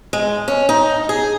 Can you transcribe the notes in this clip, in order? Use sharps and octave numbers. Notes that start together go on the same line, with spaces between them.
G#3
C#4
D#4
G#4